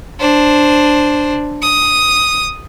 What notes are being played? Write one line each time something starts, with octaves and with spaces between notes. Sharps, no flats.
D4 C5
D#6